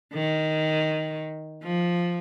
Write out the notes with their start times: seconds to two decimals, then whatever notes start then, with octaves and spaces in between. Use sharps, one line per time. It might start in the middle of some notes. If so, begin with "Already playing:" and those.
0.14 D#3
1.63 F3